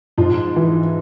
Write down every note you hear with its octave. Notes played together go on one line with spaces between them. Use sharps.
G#2 F3 F4
E3